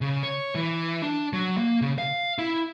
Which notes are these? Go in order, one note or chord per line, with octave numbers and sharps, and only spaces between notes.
C#3
C#5
E3
D4
F#3
A#3
C#3
F5
E4